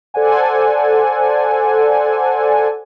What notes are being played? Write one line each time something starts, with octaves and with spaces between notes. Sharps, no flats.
A4 C5 D5 F#5 G#5